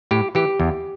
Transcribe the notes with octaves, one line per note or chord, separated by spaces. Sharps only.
A2 G4
E3 G4
E2